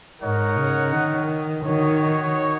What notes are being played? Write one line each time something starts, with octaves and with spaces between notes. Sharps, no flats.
G#2 D#4 A#4 C#5 F#5
C#3
D#3
D#3 D#4 F#4 C#5